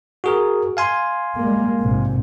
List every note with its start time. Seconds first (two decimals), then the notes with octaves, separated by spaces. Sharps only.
0.24 F#4 G#4 A#4
0.77 F5 G#5 C6
1.36 G3 G#3 A#3
1.81 A#1 G#2 C3